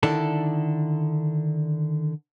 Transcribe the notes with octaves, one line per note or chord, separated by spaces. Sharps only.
D3 D#3 D4 E4 A4